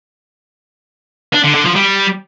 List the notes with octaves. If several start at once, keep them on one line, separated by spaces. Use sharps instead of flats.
D4
D3
D3
F3
G3